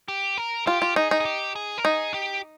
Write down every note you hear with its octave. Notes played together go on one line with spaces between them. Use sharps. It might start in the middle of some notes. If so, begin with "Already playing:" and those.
G4
A#4
F4 G4
F4
D#4 G#4
D#4
G#4
G4
G#4
A#4
D#4 G#4
G4